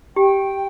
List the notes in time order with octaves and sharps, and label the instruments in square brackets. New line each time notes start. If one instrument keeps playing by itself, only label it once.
[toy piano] G4 [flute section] G5